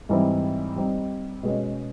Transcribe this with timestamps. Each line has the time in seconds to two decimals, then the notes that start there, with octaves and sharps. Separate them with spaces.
0.09 G#2 E3 G3 C4 E4
0.76 G3 C4 D#4
1.43 B2 G#3 C#4